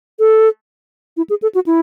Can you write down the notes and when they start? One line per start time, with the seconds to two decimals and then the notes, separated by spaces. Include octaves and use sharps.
0.19 A4
1.17 E4
1.30 G#4
1.42 A4
1.55 F#4
1.66 E4